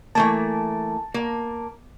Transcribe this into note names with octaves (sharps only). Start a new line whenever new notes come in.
E3 A3 A#3 A5
A#3